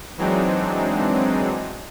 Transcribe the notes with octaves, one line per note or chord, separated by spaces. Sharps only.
E3 F#3 G#3 C4 D4 D#4